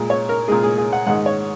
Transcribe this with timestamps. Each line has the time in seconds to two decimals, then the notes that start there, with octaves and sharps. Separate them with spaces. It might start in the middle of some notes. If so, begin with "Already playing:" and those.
Already playing: A#2 G#3
0.10 C#5
0.29 A#4
0.48 A#2 G#3 G#4
0.63 G#4
0.78 G#4
0.93 F#5
1.06 G#2 D#3 G#3 F#5
1.26 C#5